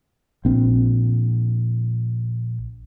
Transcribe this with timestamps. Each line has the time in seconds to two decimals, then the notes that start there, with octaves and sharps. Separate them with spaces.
0.45 A#1 C4